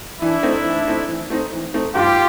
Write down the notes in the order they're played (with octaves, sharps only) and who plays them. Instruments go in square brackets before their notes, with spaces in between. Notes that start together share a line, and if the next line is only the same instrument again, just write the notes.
[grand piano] E3 [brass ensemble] D4 E4
[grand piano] A3 C4 D#4
E3
A3 C4 D#4
E3
A3 C4 D#4
E3
A3 C4 D#4
[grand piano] G2 [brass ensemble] F4 G4